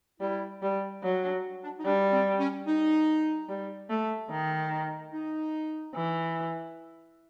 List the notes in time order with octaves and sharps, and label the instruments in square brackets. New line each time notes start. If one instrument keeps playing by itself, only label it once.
[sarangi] G3 [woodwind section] E4
[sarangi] G3
F#3
[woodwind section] D4
D4
D#4
[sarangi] G3 [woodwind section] D4
[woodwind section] C4
C#4
D#4
[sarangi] G3
A3
D#3
[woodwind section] D#4
[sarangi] E3